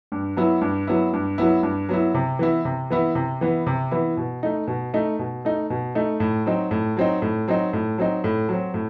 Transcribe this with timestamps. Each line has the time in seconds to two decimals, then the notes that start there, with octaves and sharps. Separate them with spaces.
0.12 G2
0.37 F#3 B3 E4
0.61 G2
0.87 F#3 B3 E4
1.13 G2
1.38 F#3 B3 E4
1.63 G2
1.89 F#3 B3 E4
2.14 C3
2.39 E3 B3 E4
2.65 C3
2.90 E3 B3 E4
3.15 C3
3.41 E3 B3 E4
3.66 C3
3.91 E3 B3 E4
4.17 B2
4.43 A3 D#4
4.68 B2
4.94 A3 D#4
5.19 B2
5.45 A3 D#4
5.70 B2
5.95 A3 D#4
6.20 A2
6.46 F#3 C4 D#4
6.71 A2
6.97 F#3 C4 D#4
7.22 A2
7.48 F#3 C4 D#4
7.73 A2
7.98 F#3 C4 D#4
8.24 A2
8.49 F#3 C4
8.74 A2